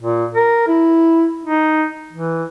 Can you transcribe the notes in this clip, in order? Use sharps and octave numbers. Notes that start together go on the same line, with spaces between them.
A#2
A#4
E4
D#4
E3